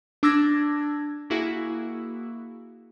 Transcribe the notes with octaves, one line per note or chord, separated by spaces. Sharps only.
D4 D6 E6 G#6 A#6
A#3 E4 F#4 G#4